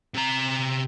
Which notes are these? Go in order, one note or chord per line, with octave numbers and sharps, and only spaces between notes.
C3 A#5